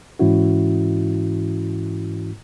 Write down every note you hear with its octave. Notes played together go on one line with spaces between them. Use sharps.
G#2 E3 C#4 E4 F#4